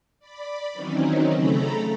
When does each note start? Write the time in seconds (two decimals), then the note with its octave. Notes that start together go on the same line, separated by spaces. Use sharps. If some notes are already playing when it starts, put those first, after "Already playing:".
0.20 D5 B5
0.73 D#3 E3 F#3 C4 C#4 D#4
1.31 C#3 A3 A4 A#5 B5